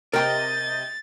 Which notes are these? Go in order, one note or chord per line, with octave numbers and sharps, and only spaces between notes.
C3 A#4 D#5 G5 A#5 G6 A6